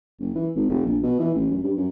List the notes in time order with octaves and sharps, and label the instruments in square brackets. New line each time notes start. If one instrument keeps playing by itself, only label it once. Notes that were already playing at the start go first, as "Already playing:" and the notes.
[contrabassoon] F#1
E3
G#1
F1
A#1
B2
E3
A1
F#2
G2
F#2